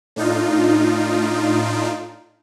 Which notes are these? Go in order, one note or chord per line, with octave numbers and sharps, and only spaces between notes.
A2 D4 D#4 F4